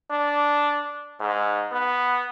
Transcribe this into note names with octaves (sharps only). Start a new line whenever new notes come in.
D4
G#2
B3